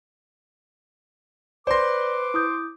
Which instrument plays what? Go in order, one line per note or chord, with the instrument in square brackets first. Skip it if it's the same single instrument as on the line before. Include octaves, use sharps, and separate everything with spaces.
[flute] B4 [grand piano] C5 C6 [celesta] D5 A#6 [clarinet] D6
[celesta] E4 D#6 G6